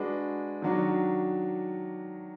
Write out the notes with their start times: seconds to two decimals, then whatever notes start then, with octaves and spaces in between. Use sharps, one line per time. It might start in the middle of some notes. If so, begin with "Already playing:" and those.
Already playing: G#3 D4 F#4 B4
0.62 D#3 F#3 D4 F#4